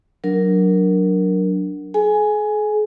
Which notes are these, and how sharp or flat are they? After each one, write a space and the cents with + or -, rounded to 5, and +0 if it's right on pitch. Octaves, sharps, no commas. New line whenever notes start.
F#3 +0 D4 +0 A#4 +0
G#4 +45 G#5 +0